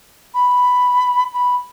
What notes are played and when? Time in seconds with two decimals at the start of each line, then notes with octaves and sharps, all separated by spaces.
0.34 B5
1.33 B5